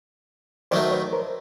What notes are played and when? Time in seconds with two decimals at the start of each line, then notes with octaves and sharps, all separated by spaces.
0.71 D#3 F#3 A3 C5 D5
0.92 B4 C#5
1.13 A#4 C5